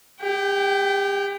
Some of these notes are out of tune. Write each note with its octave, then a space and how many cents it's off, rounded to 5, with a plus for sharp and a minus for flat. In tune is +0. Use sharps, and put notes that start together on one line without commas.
G4 +35 G5 -20